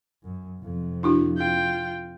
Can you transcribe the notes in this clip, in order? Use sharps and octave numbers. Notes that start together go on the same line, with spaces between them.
F#2
F2 C3
D4 E4 F#4
F4 G5